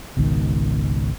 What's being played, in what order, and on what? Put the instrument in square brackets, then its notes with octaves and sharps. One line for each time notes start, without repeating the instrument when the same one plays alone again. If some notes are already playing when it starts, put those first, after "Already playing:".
[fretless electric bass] G#1 C#2 B2 D#3